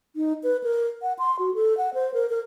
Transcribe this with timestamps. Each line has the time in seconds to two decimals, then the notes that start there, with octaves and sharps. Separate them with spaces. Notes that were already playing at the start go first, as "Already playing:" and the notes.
0.16 D#4
0.43 B4
0.63 A#4
1.02 F#5
1.19 C6
1.39 F#4
1.54 A4
1.77 F#5
1.94 C5
2.14 A#4
2.29 A#4